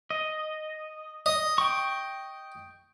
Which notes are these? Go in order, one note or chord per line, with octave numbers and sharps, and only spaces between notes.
D#5
D#5
G5 C#6